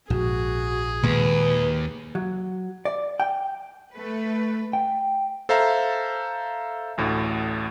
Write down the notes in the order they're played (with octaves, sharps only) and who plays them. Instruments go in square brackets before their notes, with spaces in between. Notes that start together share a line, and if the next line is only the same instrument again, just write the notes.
[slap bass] A#1 G#2 [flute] F#4 [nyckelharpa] G#4
[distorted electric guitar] D#2 [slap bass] A#2 G#3 [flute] B4
[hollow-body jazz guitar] F#3
D5
G5
[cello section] A3 B4
[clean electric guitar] G5
[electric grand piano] A4 C5 E5 F5 A#5 A6
A1 D2 A2